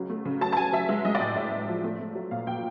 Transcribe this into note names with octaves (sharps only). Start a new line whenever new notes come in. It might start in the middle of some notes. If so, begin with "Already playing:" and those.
Already playing: C#2 F#3
A3
C#3
F#3 A5
A5
F#3 G#5
F#3 E5
G#3 E5
G#3 D#5
D5
A2 D#5
A2 E5
A2
F3
A3
A3
F#3
A#2 F5
A#2 G5